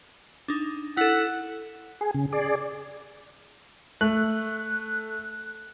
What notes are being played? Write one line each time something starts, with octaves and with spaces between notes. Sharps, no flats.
D4 D#4
E4 A4 F#5
G#4
C#3
G#4 D5
A3 F#6